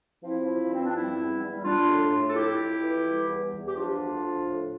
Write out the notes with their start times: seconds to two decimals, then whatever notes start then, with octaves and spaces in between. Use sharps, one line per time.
0.23 F3 C4 E4
0.47 F3
0.71 G2 C4
0.84 D4
0.94 G3 C4 E4
1.18 E2
1.41 G3
1.64 G3 D4 F4
1.88 A2
2.11 A2
2.28 A4
2.35 F2 E4 G4
2.59 F2
2.82 E3
3.05 G3
3.28 E2
3.52 E2
3.67 G4
3.75 F3 D4 F4
4.00 D2
4.22 F3
4.46 A2